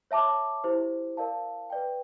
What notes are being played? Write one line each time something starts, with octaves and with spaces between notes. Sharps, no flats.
C#5 E5 A5 D6
E4 G4 C5
A#4 D5 F5 A5
B4 D5 G5